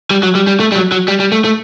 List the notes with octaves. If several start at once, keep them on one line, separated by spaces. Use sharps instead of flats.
G3
F#3
G3
G3
A3
G3
F#3
F#3
G3
G3
A3
A3